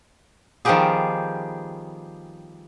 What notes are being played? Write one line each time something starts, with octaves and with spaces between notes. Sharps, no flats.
D#3 F3 G3 B3 G4 G#4